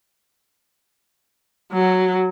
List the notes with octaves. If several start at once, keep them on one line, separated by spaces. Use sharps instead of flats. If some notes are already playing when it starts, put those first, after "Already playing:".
F#3 F#4